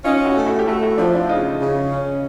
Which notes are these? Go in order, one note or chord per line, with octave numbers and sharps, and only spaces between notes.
C#4 D#4 F4
E4 F#4
A3
E4 F#4
G4
A3 E4 F#4
E4 F#4
F3 D4 E4
D4 E4
C#3 D#4 F4
C#3
C#4